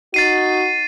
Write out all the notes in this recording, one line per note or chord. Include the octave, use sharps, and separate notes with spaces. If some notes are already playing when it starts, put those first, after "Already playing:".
D#4 F#4 A6 C7 D#7